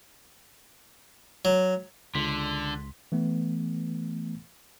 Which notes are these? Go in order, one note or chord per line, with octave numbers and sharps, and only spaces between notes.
F#3
C#2 D3 C6 B6
E3 A3 B3